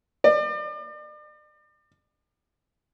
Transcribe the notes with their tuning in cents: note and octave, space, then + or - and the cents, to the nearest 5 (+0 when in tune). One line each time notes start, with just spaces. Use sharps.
D5 +40